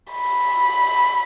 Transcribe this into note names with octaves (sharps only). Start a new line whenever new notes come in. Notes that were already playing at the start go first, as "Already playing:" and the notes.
B5